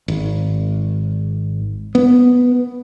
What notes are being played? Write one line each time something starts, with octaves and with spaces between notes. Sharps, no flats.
G#1
B3